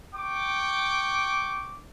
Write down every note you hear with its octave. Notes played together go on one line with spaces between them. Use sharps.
G5 C#6 D6